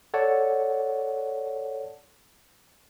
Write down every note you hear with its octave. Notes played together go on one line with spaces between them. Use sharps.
A4 C#5 D5 F#5 A5